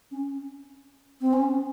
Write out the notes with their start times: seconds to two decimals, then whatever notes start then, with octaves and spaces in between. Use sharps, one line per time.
0.11 C#4
1.21 C4
1.33 C#4